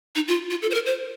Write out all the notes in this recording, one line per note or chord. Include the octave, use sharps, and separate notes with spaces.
D#4
F4
F4
A4
C5
A#4
C5